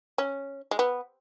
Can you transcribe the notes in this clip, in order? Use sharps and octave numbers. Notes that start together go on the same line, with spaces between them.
C#4
G#3
B3